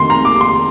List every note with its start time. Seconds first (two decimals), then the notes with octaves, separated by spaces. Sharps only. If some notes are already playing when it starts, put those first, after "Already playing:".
Already playing: F1 F2 D#3 A#3 C6
0.10 A#5
0.25 D6
0.41 C6